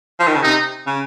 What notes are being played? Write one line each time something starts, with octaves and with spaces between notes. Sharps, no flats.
F3
D#3
C#3
C3 D#4
C#3